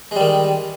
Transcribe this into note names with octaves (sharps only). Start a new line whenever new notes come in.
D#3 G3 G#3